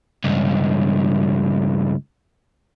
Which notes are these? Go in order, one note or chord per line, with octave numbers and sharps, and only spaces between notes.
C#2 G2